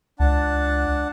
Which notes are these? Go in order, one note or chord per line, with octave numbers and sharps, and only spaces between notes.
C#2 D4 F#5 A5